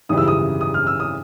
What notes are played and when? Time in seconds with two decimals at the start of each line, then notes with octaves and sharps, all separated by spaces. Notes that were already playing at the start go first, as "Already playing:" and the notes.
0.09 G#1 F#2 C#3 E3 G3 D#6
0.17 E6
0.28 D#6
0.61 D#6
0.74 F6
0.87 E6
1.00 D#6